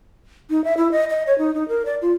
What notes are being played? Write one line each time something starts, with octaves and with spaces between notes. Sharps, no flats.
D#4
E5
E4
D#5
D#5
C#5
D#4
D#4
A#4
D5
F4